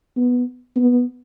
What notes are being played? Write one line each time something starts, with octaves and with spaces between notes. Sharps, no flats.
B3
B3